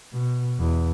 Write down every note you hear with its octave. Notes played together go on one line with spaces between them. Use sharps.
B2
E2